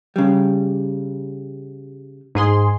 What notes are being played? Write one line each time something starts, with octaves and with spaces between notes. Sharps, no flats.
C#3 G3
G#2 G#4 C6